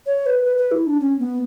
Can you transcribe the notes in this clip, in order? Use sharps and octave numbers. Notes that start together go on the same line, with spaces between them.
C#5
B4
B4
B4
E4
D4
C#4
B3